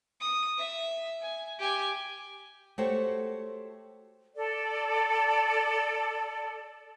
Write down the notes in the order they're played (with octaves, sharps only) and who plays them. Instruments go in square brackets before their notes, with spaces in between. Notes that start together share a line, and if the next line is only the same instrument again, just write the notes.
[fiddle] D#6
E5
G#5
G4 G#5
[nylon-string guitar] A3 F#4 G4 C5 C#5
[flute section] A4 D5